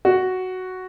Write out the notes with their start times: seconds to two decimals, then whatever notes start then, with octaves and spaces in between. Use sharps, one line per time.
0.05 F#4